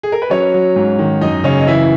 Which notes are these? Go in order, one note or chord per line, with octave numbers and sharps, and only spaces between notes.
G#4
A#4
B4
F#3 C#4 C#5
F#3
G#2
D#3
F#2 D#4 D#5
C#3 C#4 C#5
D#5
E3 E4 E5